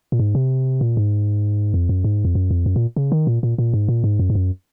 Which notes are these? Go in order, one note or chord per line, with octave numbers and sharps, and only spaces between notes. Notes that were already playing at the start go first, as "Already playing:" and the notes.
A#2
G#2
C3
A#2
G#2
F2
F#2
G#2
F2
F#2
F2
F#2
A#2
C#3
D#3
A#2
A#2
A#2
G#2
A#2
G#2
F#2
G#2
F#2